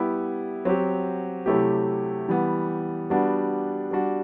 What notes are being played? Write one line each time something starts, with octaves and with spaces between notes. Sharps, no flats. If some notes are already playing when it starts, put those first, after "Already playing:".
Already playing: G3 B3 E4 G4
F#3 C4 G4
C3 F#3 A3 E4 G4
E3 G3 B3
G3 B3 D4 F#4
G3 D4 F#4